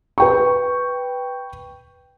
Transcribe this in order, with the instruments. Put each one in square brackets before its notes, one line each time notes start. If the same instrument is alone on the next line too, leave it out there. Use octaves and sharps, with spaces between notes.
[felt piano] B4 G5 C#6